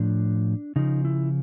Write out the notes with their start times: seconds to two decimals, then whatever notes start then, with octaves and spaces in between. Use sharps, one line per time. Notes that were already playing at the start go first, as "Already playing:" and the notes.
Already playing: A2 F3 D4
0.76 C#3 F3 D#4
1.05 E4